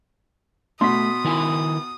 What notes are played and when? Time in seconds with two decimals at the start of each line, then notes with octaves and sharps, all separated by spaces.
0.81 B2 A3 C6 D#6 B6
1.24 D#3 E4 G#5